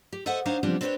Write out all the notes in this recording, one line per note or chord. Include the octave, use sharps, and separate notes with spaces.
G4
A4 C5 D#5 E5 F#5
D4 D#4 C5 C#5 F5 F#5
C#3 F3 G3 B3 C4 D4
C4 D4 G4 G#4 B4 C#5